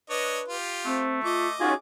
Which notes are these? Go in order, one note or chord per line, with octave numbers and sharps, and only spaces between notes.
D4 B4 C#5 D#5
F4 G4
A3 C4
F4 D#5 D6
C#4 D#4 F4 F#4 G#4